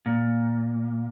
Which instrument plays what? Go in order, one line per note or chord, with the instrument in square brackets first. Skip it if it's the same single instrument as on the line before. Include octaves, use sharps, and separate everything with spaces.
[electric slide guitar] A#2